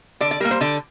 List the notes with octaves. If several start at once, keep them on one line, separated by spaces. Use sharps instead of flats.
D3 D5
D5
G3 A#3 A#4
C5
D3 D5